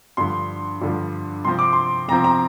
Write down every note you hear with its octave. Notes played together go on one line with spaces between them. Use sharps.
G2 D3 F3 C6
G2 D3 F3
C3 F3 C4 C6
D6
C6
C3 F3 C4 A#5
A#5